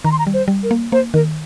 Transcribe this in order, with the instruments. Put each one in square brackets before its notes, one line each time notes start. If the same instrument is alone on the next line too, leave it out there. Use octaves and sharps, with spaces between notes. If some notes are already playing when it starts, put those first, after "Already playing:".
[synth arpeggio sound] D#3 [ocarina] A#5
[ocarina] C6
A#5
[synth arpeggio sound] G3
[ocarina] C5
[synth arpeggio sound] G3
[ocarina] A#4
[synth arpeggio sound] A#3
[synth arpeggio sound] A#3 [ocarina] C5
[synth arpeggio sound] D#3 [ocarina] A#4